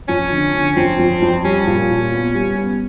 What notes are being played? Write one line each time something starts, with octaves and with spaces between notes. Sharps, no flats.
F2 C#4
D3
D3
F2 C4
F2
F2
G3 C#4
A#2
A#2
B3
G3
B3